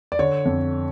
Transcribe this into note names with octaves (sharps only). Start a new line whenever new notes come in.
D5
D3 C#5
F2